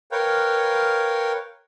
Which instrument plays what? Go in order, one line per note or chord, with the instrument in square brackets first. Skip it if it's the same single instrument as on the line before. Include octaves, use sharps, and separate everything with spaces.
[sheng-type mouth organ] A#4 B4 C#5 F5 G5